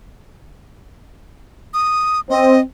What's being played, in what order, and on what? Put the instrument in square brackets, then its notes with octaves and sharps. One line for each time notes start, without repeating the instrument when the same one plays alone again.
[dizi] D#6
[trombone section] C4 [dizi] D#5